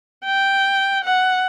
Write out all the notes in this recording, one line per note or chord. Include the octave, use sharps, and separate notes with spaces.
G5
F#5